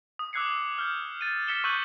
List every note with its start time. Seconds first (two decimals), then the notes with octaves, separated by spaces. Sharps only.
0.19 D#6
0.33 D6 E6 F#6 G#6 C7 C#7
0.78 F6 G6
1.21 A6 D#7
1.47 F6 B6 C#7 E7 G7
1.64 C#6 E6 F#6 G6 D#7 F#7